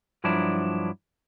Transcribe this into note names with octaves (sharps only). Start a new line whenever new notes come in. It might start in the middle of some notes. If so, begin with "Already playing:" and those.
G2 F3 F#3 D4 E4 A5